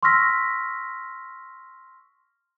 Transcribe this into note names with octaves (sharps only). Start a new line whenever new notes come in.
C6 C#6 E6 F6 A#6 B6